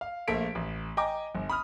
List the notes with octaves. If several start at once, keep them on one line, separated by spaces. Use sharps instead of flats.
F5
A#1 A3 A#3 A4 B6 D7
A1
D#5 G5 G#5 A#5 D6
G1
B5 D#6 F6